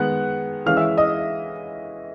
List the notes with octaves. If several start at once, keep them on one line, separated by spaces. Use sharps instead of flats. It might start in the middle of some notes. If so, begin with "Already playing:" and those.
Already playing: D#3 G#3 B3 F#5 F#6
E3 G#3 C#4 F5 F6
E5 E6
D#5 D#6